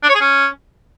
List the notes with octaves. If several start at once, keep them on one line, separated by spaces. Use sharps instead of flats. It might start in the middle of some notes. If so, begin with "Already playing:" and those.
D4
C#5
G#4
C#4